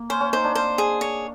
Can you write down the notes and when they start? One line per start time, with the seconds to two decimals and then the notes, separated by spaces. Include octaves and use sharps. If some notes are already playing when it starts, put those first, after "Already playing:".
Already playing: A#3
0.10 C#4 C5
0.20 C#4
0.33 D#4 C5
0.44 D4
0.55 C5
0.78 G#4
1.01 C#5